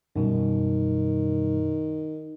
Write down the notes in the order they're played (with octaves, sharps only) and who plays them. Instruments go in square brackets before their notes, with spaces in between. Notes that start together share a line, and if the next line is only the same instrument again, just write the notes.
[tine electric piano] F#2 B2 G3 [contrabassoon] D#3